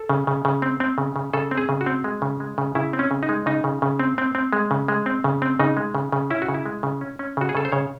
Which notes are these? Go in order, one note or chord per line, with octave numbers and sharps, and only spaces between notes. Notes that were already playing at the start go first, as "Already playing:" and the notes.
Already playing: A4
C#3
C#3
C#3
C4
C4
C#3
C#3
C#3 A4
C4
G#4
C#3
F#4
C4
G#3
C#3
G#3
C#3
C#3 E4
C4
C#4
C#3
D#4
G#3
C#3 D#4
C#3
C#3
C4
C4
C4
G#3
C#3
G#3
C4
C#3
C4
C#3 D#4
G#3
C#3
C#3
C#4 E4
F#4
C#3
E4
G#3
C#3
C#4
C#4
C#3 F#4
G#4
C#3 A4
C5
C#3 C#5